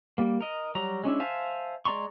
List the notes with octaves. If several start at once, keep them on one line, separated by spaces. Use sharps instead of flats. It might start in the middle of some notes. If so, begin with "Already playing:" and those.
G3 A#3
A#4 D#5
F#3 G3 A#5
G#3 C#4 D4 E4
C5 E5 F5 G#5 A5
G#3 D5 A#5 C6 C#6